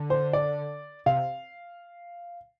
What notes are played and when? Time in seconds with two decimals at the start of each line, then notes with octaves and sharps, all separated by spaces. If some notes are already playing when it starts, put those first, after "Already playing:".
Already playing: D3
0.10 C5
0.33 D5
1.06 C3 F5